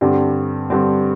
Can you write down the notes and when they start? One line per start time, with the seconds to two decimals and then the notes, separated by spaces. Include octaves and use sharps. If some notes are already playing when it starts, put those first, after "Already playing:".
0.01 G2 D3 G3 C4
0.70 G2 D3 G3 C4